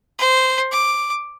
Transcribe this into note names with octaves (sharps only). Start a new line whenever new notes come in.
C5
D6